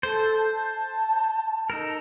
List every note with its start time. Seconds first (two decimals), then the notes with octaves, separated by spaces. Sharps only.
0.03 A4 C5
0.52 A5
1.70 D#4 A4 A#4